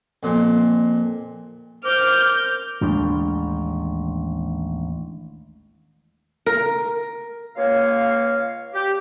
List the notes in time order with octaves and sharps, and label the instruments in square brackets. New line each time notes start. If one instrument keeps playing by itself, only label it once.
[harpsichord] F2 A#2 C6
[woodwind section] A#4 C5 D6 [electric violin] F6 G6
[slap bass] A1 D#2 G#3 D4
[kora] A#4
[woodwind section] C#2 A#3 C#5 F5
G4